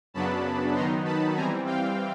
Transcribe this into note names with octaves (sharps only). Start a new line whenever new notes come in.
F#2 C#3 F#3 B3 D4 A5 B5
D#3 F#3 B3 D#4 A#5 C6
A5 B5
E3 G3 C4 G#5 A#5
F5 G5